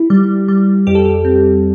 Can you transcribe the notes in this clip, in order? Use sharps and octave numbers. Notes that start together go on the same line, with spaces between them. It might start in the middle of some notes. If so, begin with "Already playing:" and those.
Already playing: E4
G3
G3
F2 G4
A4
G4
C4